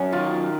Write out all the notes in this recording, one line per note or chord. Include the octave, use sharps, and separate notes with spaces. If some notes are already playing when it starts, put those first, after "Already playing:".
Already playing: F#2 C#4
D#3 F4